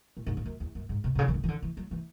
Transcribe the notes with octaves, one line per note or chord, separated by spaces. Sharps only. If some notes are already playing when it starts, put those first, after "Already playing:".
A2
G#2
G#2
F#2
E2
F#2
G#2
B2
B2
C#3
E3
D3
E3
D3
E3
F#3
E3